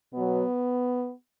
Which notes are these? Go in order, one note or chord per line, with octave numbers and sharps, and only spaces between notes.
B2 F#3 B3